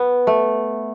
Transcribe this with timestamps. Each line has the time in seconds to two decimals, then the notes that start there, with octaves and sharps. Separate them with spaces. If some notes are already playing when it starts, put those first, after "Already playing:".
Already playing: B3
0.27 A3